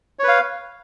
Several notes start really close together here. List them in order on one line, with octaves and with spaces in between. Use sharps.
C#5 B4 F5